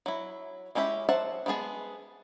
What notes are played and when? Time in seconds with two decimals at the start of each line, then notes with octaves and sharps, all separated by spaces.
0.06 F#3 E4
0.75 G#3 C#4 E4 G4 E5
1.09 F#3 C5 E5 F#5 A5
1.46 E3 G#3 B3 G#4 A5